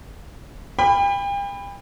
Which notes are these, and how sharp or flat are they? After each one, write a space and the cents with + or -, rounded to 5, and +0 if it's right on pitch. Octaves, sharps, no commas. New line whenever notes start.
G5 +40 B5 +5